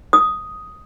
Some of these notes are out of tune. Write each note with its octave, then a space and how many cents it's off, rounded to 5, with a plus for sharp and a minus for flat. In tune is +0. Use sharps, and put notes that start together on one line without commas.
D#6 +5